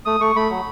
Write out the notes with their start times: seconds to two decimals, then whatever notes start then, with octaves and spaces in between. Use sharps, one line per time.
0.05 A3 D#6
0.20 A3 C#6
0.36 A3 B5
0.50 F#3